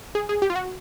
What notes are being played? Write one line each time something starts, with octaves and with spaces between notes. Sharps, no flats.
G#4
G#4
G4
F4
F#4